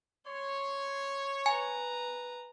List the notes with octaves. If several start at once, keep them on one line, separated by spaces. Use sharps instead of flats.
C#5 C6
B4 G#5 A#5